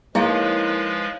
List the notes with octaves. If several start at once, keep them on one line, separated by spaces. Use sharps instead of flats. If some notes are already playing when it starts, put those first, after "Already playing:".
F3 G#3 A#3 D#4 E4 B4 C#5 F5